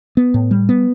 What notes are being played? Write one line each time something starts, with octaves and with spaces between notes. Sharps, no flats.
B3
A2
G3
B3